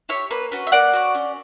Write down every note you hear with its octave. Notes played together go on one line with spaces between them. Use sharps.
E4 G4 C#5 E5
A#3 B4
C#4 F#4 B4
E5
A#3 D5 F#5
C#4 F#4
C#4